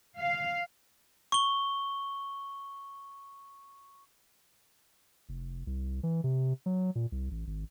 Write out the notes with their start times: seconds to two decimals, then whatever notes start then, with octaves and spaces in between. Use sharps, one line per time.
0.19 F5
1.32 C#6 G7
5.29 F1
5.67 C2
6.03 E3
6.24 C3
6.66 F#3
6.95 A#2
7.12 C2
7.31 A1
7.47 G#1